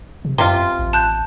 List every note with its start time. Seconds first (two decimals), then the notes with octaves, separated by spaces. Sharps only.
0.25 C3
0.38 F#2 C3 F4 C6
0.79 A1
0.93 A5 F#6 G6